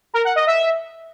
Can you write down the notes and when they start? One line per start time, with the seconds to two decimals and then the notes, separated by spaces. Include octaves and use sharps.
0.14 A#4
0.25 F#5
0.36 D#5
0.47 E5